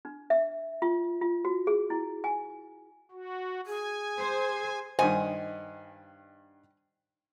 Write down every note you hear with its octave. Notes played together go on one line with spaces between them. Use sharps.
D4
E5
F4
F4
F#4
G#4
E4
G#5
F#4
G#4 G#5
C5
G2 D#3 C5 D#5 F#5 G#5